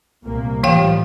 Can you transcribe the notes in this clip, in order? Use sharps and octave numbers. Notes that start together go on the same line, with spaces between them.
C2 A#2 A#3
A2 E3 F3 G3 F5 G5